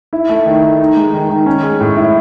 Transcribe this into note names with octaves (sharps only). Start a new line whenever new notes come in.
E4
A3
D#3
D#3
D#4
G#3
D#3
D#3
C#4
G#3
A2
E4